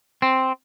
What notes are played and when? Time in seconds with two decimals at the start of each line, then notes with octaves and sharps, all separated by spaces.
0.22 C4